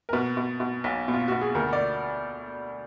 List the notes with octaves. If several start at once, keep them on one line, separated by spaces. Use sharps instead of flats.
A#4
B2 B4
B2
B2
B1
B2
F4
B2 F#4
G#4
D2 A#4
D5